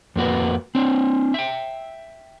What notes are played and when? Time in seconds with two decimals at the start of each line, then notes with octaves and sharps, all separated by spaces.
0.16 F2 A#3 F#4 B4
0.75 C4 D4
1.34 E5 G5